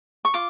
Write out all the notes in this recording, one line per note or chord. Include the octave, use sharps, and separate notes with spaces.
C#6
F4 D6